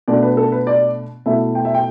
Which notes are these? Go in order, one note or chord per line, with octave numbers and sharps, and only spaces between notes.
B2 A3 D4 D5
B4
A4
B4
D5
B2 A3 E4 E5
G5
E5
G5